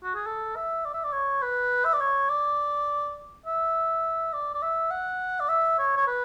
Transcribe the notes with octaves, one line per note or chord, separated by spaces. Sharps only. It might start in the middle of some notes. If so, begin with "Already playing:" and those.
F#4
G#4
A4
E5
D5
E5
D5
C#5
B4
E5
D5
C#5
D5
E5
D5
D5
E5
F#5
D5
E5
C#5
C#5
B4